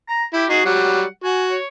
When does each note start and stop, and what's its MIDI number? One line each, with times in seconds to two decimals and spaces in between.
0.08 0.24 82
0.34 0.45 64
0.34 0.48 67
0.50 0.60 63
0.50 0.60 66
0.50 0.64 68
0.65 1.03 54
0.65 1.03 55
0.65 1.05 78
1.24 1.55 66
1.24 1.44 80
1.50 1.66 73